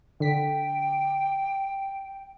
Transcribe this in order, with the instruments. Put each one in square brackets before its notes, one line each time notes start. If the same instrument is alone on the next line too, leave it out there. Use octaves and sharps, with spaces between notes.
[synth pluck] D3 B6 [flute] G5